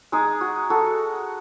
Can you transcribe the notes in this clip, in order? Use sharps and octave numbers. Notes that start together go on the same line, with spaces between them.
G#3 D#4 G#4
F#4
F#4 A4